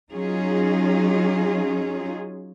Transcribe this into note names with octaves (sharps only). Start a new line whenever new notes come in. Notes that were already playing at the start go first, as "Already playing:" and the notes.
F#3 C#4 D#4 F4 G#4